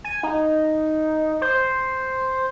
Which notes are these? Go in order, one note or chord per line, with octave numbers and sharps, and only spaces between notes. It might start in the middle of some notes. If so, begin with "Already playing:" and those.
G#5
D#4
C5